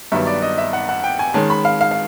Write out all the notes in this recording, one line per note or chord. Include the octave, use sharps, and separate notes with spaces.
G2 D#3 F#3 B3 E5
D5
D#5
E5
F#5
F#5
G5
G#5
D#3 G#3 C#4 A5
B5
F5
F5
F5